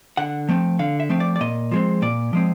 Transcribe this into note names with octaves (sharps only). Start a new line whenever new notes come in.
D3 F#5
F3 A3 C4
D3 F5
E5
F3 A3 C4
D5
D5
A#2 D#5
F3 G#3 C4
A#2 D5
F3 G#3 C4